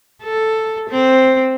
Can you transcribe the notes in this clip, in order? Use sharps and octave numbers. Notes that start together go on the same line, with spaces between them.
A4
C4